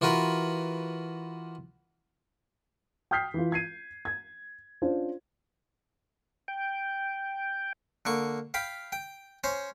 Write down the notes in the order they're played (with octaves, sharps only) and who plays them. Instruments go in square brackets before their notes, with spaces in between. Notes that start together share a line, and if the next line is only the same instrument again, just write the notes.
[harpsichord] E3 F4 F#4 A#4 B4
[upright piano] G5 D#6 F6 G6 B6 C7
E3 F4
G#6 C7 D#7
G#6
C#4 D4 F4 C5
[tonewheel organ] G5
[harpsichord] D3 A#3 C#6
F5 G5 B5
G5
C#4 C5 C#5